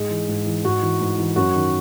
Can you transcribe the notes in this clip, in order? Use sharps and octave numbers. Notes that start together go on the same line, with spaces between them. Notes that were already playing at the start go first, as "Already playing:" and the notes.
Already playing: G#2 G#3
E3
G#2
E3
G#2 F#4
E3
G#2
E3
F#2 F#4
D#3